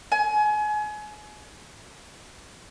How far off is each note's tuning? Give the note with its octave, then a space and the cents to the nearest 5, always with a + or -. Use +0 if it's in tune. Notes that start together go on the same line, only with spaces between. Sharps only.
G#5 +30